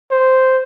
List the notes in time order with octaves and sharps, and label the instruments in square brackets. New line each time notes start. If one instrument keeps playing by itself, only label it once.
[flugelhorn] C5